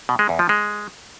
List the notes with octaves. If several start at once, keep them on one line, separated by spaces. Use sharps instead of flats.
B2
G#3
E2
F3
G#3